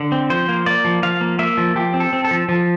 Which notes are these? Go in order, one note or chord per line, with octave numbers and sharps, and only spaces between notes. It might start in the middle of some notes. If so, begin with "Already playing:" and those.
Already playing: D3
C4
F3 C5
A#3
A#3 D5
F3
F3 F5
A#3
A#3 E5
F3
F3 G4
C4
A4
C4
A4
F3
F3